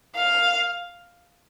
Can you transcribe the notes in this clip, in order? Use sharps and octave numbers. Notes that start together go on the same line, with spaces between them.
F5